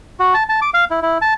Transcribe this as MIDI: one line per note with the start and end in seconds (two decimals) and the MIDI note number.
0.20 0.34 66
0.34 0.43 81
0.49 0.60 81
0.62 0.70 86
0.74 0.85 77
0.91 1.00 64
1.02 1.18 64
1.22 1.34 81